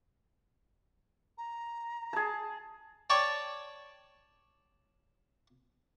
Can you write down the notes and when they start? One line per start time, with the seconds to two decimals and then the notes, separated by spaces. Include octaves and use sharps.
1.38 A#5
2.13 G#4 A5
3.10 C#5 D5 G5 A5 C#6